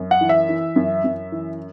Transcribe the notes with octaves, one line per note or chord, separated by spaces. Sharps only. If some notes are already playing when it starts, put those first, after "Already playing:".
Already playing: F#2
F#5
E3
E5
E3
F#2
F#2
E3